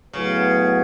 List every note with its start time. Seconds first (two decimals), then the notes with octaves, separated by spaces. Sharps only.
0.13 A2 C#3 F#3 B3